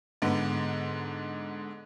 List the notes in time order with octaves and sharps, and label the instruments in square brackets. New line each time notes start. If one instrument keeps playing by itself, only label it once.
[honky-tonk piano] G#2 D3 B3